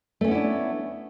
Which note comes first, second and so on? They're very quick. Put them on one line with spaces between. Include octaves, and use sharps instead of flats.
A3 C#4 B3 E4 D4